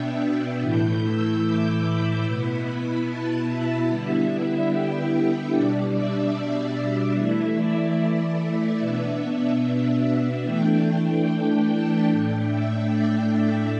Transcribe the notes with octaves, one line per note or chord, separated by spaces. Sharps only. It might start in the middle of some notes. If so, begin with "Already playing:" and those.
Already playing: B2 B3 D4 E5 G5
A2 E3 A3 E4 G6
E6
D6
B5
B2 B3 E4
A5
E5
D3 G3 B3 E4
G5
E5
B2 G3 D4 D5
E5
D5
E3 A3 E4 E5
D5
E5
E5
B2 B3 D4
E5
E5
E3 A3 D4 G5
A5
A2 A3 D4 G5
E5
D5